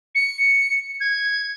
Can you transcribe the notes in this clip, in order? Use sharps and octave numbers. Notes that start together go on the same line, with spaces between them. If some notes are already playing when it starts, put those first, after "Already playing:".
C#7
G#6